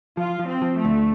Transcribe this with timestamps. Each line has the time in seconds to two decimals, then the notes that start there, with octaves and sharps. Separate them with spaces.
0.17 F3 F4
0.39 F3
0.47 C4
0.62 F3
0.77 A3
0.85 D2